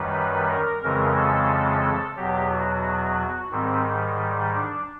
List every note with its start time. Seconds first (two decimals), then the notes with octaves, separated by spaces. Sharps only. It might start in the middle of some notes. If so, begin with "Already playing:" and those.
Already playing: F#2 D#3 G3 B4
0.49 A#4
0.83 F2 C#3 E3 G#3 A#4
1.17 A4
2.17 E2 B2 F#3 G4
2.51 F#4
3.51 G#2 D#3 G3 C4
4.52 D4